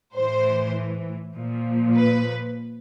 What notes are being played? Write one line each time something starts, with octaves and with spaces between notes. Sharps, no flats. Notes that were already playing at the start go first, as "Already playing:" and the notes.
A2 E3 C5
A#2 F3
B4